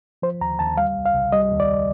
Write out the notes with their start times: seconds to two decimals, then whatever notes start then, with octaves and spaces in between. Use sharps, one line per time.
0.22 F3 C5
0.41 D#2 A#5
0.59 D#2 A5
0.77 G3 F5
0.96 C2
1.05 F5
1.14 C2
1.32 G3 D#5
1.51 D#2
1.60 D5